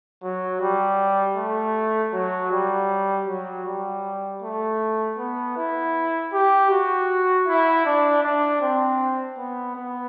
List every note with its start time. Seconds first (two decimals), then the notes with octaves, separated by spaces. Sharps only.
0.23 F#3
0.61 G3
1.37 A3
2.13 F#3
2.51 G3
3.28 F#3
3.65 G3
4.42 A3
5.18 B3
5.57 E4
6.33 G4
6.71 F#4
7.47 E4
7.86 D4
8.23 D4
8.61 C4
9.38 B3
9.76 B3